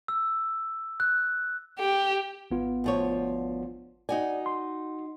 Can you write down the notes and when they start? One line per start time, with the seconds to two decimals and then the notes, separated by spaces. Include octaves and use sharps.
0.08 E6
1.00 F#6
1.79 G4
2.51 G#1 B3 F4
2.84 D2 F3 C#5
4.09 D#4 F#4 D5 G#5
4.46 C6